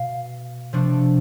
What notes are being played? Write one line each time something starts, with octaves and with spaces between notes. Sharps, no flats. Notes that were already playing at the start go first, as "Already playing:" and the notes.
Already playing: B2 F5
C3 F3 A3 D4